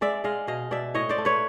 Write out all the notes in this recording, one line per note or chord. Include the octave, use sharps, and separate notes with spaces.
G#3 D5 E5
G#3 D#5 F5
B2 D#5 F5
B2 D5 E5
A2 C#5 D#5
C5 D5
A3
B4 C#5